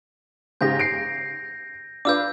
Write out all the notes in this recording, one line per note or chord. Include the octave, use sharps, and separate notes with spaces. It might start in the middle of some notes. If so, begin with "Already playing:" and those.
G#2 C#3 G4 G6 A#6
C7 D7
D4 F4 B4 D6 E6 G6